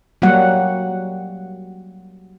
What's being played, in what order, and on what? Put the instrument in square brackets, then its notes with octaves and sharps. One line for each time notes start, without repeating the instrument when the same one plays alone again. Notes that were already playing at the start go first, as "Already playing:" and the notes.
[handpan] F#3 G3 A#3 F#4 F#5